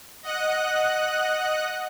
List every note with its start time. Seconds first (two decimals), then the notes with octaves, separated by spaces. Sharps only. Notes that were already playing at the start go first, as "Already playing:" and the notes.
0.23 D#5 F#5 F#6